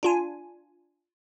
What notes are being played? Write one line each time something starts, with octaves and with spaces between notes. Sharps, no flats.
D4 F4 G#5